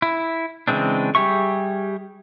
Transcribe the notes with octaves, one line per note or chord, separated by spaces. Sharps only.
E4
C#3 E3 G#3 C4 D4
G3 G4 G#4 E5 C#6